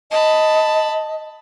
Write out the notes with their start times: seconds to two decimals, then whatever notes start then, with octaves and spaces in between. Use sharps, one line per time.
0.11 D#5 A5 B5